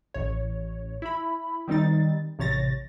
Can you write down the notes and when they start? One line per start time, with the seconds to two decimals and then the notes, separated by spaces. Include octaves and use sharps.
0.14 A1 C#5
1.02 E4 B5
1.67 D#3 G3 C4 D#4 A6
2.39 A1 C3 C#5 A6 A#6